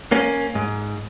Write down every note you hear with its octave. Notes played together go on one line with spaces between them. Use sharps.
A#3 C#4
G#2